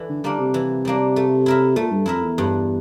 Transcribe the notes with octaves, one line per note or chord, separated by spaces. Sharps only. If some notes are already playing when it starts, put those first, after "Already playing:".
Already playing: E3 A3 D4
D3
D3 G3 A#3 D4
C3
E3
G3 A#3 D4
A3
E4 A#4 E5
A#2 A3
G2
F2 E4 A#4 E5
E2
G2